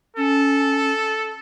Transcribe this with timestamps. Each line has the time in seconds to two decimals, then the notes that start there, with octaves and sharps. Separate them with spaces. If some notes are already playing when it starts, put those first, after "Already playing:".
0.16 C#4 A4